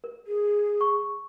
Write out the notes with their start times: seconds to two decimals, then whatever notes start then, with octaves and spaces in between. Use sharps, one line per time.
0.04 A#4
0.27 G#4
0.81 C#6